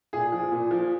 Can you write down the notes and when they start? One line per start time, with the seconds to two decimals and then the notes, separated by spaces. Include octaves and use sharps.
0.13 A#2 G#4
0.32 F3
0.52 A#2
0.71 F3